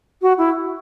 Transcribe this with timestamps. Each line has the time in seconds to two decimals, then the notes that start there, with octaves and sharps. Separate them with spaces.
0.22 F#4
0.38 E4